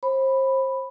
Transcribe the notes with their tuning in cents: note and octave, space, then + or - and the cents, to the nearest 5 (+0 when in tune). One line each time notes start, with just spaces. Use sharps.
C5 +30 B5 +0